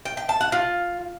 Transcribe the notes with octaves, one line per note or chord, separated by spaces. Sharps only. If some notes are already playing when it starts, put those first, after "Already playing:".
G5
G5
A5
F#5
F4